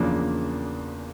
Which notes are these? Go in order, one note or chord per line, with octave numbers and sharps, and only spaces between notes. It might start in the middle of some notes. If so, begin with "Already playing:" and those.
Already playing: E2 C#3 F3 A#3 D4